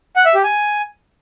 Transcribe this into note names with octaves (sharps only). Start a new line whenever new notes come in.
F#5
E5
G4
G#5